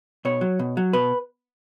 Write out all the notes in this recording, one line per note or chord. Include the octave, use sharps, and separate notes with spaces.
B2 C#5
F#3
B2
F#3
B2 B4